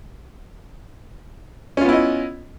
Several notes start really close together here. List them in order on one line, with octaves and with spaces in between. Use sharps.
C#4 F4 B3 E4 D#5